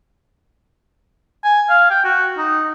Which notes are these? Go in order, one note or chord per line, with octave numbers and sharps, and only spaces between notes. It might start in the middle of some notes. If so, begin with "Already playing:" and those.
G#5
F5
G5
F#4
D#4